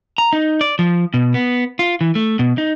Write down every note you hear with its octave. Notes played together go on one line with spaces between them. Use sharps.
A#5
D#4
D5
F3
B2
B3
F4
E3
A3
B2
D#4